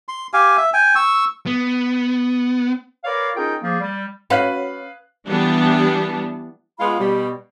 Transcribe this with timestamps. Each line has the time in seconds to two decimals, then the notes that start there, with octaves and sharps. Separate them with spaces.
0.08 C6
0.33 G4 F5 G#5
0.57 E5
0.74 G5 G#5
0.95 C#6 E6
1.46 B3
3.04 A#4 B4 C#5 D5 F5
3.36 C#4 D#4 F4 G#4 A#4 G5
3.62 F3 A#3 G#4
3.81 G3
4.30 C#4 F#4 B4 F5 F#6
5.28 E3 G3 B3 D4
6.79 G#3 B3 F4 B5
6.99 B2 G3